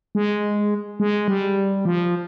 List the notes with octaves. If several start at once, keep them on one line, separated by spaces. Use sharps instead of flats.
G#3
G#3
G3
F3